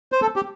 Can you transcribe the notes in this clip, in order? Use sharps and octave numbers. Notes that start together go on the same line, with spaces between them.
C5
A4
G4